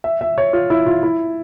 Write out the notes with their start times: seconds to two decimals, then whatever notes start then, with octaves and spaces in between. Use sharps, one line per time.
0.04 E5
0.21 E5
0.38 C#5
0.53 F4
0.70 E4
0.86 F4
1.03 E4